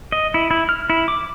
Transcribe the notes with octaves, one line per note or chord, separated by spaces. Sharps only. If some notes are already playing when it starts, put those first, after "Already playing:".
D#5
E4
E4
F6
E4
D6